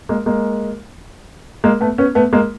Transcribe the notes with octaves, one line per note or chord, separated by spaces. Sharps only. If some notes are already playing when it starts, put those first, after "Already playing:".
G#3 A#3
G#3 A#3
G#3 A#3
A3 B3
B3 C#4
A3 B3
G#3 A#3